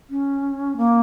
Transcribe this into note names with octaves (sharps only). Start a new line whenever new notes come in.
C#4
A#3